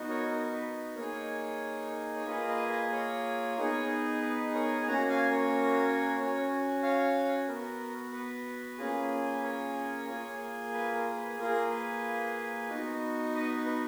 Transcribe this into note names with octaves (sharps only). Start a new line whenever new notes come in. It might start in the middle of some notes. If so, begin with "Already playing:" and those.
Already playing: B3 D#4 F#4
A#4 C#5
A#4
B4
A#3 D#4 G#4 A#4 C#5
C#5
A#3 F4 G#4 B4 D#5
B4 D#5
B4 D#5
A#4 C#5
B3 D#4 G#4
B4
A#4 C#5
G#5
A#3 C#4 F#4 F#5 A#5
F5 G#5
A#4 C#5
C#4 F#4
C#5 F5
B3 F#4 A#4
B4
A#3 C#4 F4 G#4
B4
A#4 C#5
A#3 F4 G#4
B4
A#4
B4
A#3 F4 G#4 A#4
B4
B3 D#4 F#4
B4 D#5
B4
B4